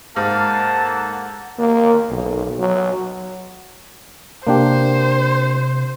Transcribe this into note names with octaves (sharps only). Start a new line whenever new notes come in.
G#2 A#3 F5 F#5 A5
A4
A#3
B1
F#3
C3 A#3 D4 G4 C5